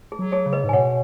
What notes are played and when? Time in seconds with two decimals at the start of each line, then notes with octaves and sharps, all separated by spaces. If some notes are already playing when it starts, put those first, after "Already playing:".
0.12 G#4
0.19 F#3
0.32 G#4 C#5
0.46 C#3
0.53 B4 D#5
0.64 G#2
0.69 G#5
0.73 B2 C#5 F#5